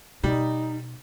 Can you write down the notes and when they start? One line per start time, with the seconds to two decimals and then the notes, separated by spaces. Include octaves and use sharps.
0.23 B2 G3 D#4